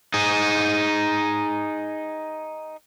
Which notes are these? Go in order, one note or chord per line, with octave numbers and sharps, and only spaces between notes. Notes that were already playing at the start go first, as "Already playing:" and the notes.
D#4 G#4